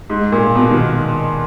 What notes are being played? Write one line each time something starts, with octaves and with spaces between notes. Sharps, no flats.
G#2
A#2
B2
D#3